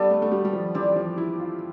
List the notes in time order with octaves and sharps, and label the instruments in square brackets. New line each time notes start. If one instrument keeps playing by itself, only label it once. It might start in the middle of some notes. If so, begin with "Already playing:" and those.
Already playing: [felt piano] G3 [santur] B3 D4 A4
[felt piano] A3
A3
G3
G3
F3
[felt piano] E3 [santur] C4 G4 D5
[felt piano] F3
E4
F4